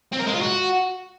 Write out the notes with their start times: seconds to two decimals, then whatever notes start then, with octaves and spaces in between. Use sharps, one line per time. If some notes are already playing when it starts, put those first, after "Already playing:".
0.12 C4
0.20 A#4
0.27 G#3
0.34 F4
0.41 F#4